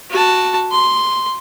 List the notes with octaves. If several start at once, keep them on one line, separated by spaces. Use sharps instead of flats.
F#4 A5
C6